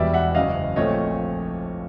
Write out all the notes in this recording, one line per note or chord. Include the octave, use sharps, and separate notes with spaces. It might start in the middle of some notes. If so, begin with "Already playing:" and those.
Already playing: E1 E2 B2 G3 D5 E5
E5 F#5
F#1 F#2 C#3 D#5 F5
A#1 A#2 F3 A3 C4 C#5 D#5